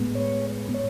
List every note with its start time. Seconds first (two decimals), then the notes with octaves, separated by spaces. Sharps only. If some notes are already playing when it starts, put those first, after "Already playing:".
Already playing: A2 G#3 B3
0.15 C#5
0.74 C#5